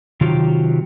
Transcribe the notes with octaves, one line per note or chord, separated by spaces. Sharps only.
C3 D#3 F#3 F4 G4